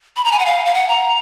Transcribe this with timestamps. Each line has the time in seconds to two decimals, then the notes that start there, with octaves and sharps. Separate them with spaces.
0.17 B5
0.24 A#5
0.32 G#5
0.39 F#5
0.46 F5
0.65 F5
0.74 F#5
0.89 A#5